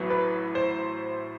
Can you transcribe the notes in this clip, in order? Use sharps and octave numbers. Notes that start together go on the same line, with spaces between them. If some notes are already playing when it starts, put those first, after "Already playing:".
Already playing: A1 A2 F#3 B3
B4
C5